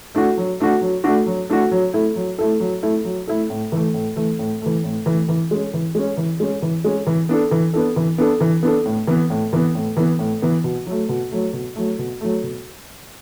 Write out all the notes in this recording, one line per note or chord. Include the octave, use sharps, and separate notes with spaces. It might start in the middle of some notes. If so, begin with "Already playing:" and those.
A3 D4 F#4
F#3
A3 D4 F#4
F#3
A3 D4 F#4
F#3
A3 D4 F#4
F#3
A3 E4 A4
F#3
A3 E4 A4
F#3
A3 E4 A4
F#3
A3 E4 A4
A2
E3 A3
A2
E3 A3
A2
E3 A3
A2
E3 A3
E3
G#3 C#4
E3
G#3 C#4
E3
G#3 C#4
E3
G#3 C#4
E3
B3 D4 A4
E3
B3 D4 A4
E3
B3 D4 A4
E3
B3 D4 A4
A2
E3 B3
A2
E3 B3
A2
E3 B3
A2
E3 B3
B2
F#3 A3
B2
F#3 A3
B2
F#3 A3
B2
F#3 A3
B2